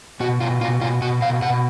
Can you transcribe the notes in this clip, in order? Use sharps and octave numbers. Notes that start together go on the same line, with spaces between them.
B2 F#4
B2 F4
B2 F4
B2 F4
B2 F#4
B2 F5
B2 F#5